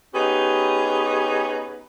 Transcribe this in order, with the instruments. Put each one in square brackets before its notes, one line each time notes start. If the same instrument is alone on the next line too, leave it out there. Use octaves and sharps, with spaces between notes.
[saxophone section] B3 C#4 D#4 G4 G#4